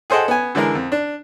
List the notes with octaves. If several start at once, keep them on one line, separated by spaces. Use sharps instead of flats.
G#4 A4 C5 D#5 F#5 G5
B3 G#5
D3 E3 G#3 A#4
F2
D4